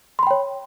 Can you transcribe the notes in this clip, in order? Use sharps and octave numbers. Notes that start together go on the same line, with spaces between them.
C#5 G5 B5 C6